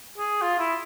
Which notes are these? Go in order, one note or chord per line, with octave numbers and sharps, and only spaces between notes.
G#4
F4
E4